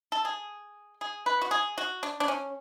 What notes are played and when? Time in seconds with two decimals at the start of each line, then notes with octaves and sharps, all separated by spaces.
0.12 A4
0.25 G#4
1.01 G#4
1.26 B4
1.42 F#4
1.51 G#4
1.78 F#4
2.03 D4
2.20 D4
2.28 C#4